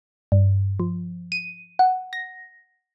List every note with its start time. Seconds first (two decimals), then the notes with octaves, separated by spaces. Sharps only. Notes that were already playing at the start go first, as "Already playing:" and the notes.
0.32 G2
0.80 F3
1.32 D#7
1.79 F#5
2.13 A#6